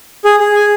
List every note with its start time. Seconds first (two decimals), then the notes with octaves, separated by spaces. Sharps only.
0.25 G#4
0.40 G#4
0.55 G#5